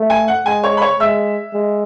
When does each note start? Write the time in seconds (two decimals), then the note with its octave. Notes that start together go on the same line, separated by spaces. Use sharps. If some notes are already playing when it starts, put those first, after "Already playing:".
Already playing: A3
0.10 G#5
0.28 F#5
0.46 G#3 G#5
0.63 C#5 C#6
0.77 B5
0.81 C#5 C#6
1.00 G#3 E5 E6
1.53 G#3